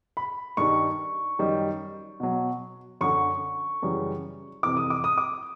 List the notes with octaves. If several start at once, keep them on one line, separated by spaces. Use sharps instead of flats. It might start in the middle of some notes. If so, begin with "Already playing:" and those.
B5
G2 D#3 G3 C#6
F#2 D#3 G3
B2 F#3
F#2 D3 F#3 C#6
F#2 C#3 E3 G3
F2 C3 E3 D6
D#6
D6
D#6
D6